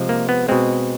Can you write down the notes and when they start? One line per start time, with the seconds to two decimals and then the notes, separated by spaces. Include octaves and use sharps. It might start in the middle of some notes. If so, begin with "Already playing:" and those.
Already playing: C3 F3 G#3
0.09 A#3
0.29 B3
0.48 B2 G#3 C4